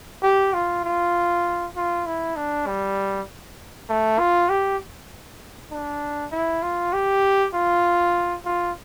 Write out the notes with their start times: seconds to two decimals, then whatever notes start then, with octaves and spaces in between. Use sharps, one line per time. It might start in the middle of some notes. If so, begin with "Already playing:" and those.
0.23 G4
0.53 F4
0.84 F4
1.76 F4
2.06 E4
2.36 D4
2.67 G3
3.89 A3
4.19 F4
4.50 G4
5.71 D4
6.32 E4
6.62 F4
6.93 G4
7.54 F4
8.45 F4